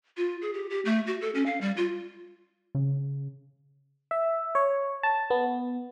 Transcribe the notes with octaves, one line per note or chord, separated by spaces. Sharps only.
F4
G#4
G4
G4
A3
F#4
A4
C#4
F5
G3
F4
C#3
E5
C#5
A5
B3